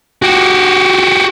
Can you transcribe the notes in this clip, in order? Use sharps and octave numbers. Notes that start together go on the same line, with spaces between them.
F#4 G4